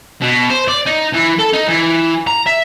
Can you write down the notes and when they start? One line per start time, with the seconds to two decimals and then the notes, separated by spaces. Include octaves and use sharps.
0.22 B2
0.50 C5
0.68 D5
0.86 D#4
1.13 E3
1.39 A4
1.53 D#4
1.68 E3
2.27 A#5
2.46 E5